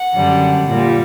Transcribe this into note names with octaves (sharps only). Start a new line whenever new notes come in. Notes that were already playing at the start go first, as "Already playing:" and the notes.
Already playing: F#5
F#2 D3 G3
A#2 G3